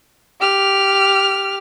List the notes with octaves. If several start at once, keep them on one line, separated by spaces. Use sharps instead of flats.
G4 F6